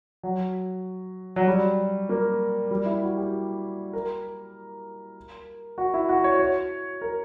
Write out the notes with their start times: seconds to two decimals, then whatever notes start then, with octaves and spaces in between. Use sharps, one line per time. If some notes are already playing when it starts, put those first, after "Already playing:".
0.23 F#3
1.36 F#3
1.48 G3
2.09 A#3
2.71 G3
2.86 E4
3.02 F#4
3.17 G4
3.93 A#4
5.78 F#4
5.94 E4
6.09 F#4
6.24 C#5
6.39 C#5
7.01 A#4